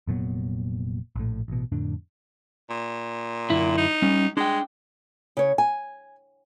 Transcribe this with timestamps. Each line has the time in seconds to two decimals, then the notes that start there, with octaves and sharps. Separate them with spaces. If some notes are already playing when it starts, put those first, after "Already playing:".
0.07 F1 A#2 F#3 B3
1.16 A#1 A2
1.48 A1 B2
1.72 F2 A2 D3 D4
2.70 A#2
3.50 F#2 D3 E4
3.78 D#4
4.02 G3 C#4
4.37 G#3 D4 G5
5.37 C#3 C#5
5.58 G#5